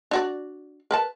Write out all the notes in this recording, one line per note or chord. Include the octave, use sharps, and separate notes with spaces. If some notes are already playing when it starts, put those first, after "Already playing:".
D4 F#4 D5
A#4 B4 A5